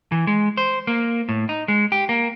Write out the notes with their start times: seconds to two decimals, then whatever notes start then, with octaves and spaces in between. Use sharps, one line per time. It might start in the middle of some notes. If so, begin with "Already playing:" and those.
0.12 E3
0.27 G#3
0.57 C5
0.87 A#3
1.29 A2
1.49 D#4
1.68 G#3
1.92 G4
2.09 A#3